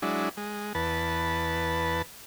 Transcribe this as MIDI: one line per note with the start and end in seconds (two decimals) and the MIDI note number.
0.02 0.29 54
0.02 0.29 56
0.02 0.29 62
0.02 0.29 64
0.37 0.73 56
0.75 2.02 40
0.75 2.02 71
0.75 2.02 81